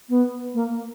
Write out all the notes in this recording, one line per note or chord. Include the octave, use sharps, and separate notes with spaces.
B3
A#3